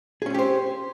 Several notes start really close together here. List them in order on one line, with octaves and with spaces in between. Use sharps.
G#4 C#4 C4 G4 C5